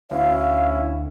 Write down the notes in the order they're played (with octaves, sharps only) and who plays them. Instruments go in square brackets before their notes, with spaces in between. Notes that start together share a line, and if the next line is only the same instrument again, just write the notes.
[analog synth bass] D2 [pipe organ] C#4 E4 [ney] F5